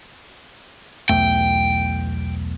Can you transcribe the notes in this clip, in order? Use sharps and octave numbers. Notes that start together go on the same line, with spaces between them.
B1 E2 A3 G5